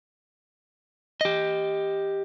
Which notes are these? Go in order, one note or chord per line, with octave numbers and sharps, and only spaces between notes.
G4 D#5